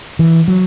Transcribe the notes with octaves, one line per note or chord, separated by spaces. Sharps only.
E3
F#3